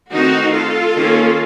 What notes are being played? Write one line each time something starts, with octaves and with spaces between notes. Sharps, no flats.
D#3 A3 C4 D#4 F#4
F4 A4
D#3 A#3 C#4